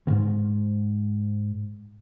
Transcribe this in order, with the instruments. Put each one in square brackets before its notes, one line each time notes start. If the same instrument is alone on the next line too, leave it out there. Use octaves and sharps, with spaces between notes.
[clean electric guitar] C#2 G#2